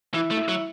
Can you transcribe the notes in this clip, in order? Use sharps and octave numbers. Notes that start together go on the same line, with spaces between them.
E3 E4
A3
E4
F#3